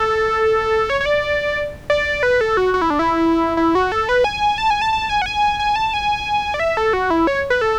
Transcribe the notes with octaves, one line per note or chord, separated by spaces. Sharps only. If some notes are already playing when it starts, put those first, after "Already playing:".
Already playing: A4
C#5
C#5
D5
D5
B4
A4
F#4
F#4
E4
D4
E4
E4
F#4
A4
B4
G#5
A5
G#5
A5
A5
G#5
F#5
G#5
G#5
A5
G#5
D5
E5
A4
F#4
E4
C#5
B4
A4